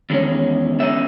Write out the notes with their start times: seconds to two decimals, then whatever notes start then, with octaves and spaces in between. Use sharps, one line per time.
0.10 E2 D#3 G#3 C#4
0.79 E2 D#3 G#3 C#4 E5